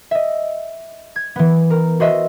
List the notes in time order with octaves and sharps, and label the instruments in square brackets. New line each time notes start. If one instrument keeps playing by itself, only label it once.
[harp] D#5 E5
G#6
E3 B3
A#4
F#4 C5 D#5 E5